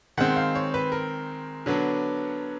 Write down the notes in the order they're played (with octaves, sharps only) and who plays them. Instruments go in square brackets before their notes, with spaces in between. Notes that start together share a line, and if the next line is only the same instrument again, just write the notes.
[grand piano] D#3 G#3 C4 F#5
F5
C#5
B4
A#4
D3 F#3 B3 D4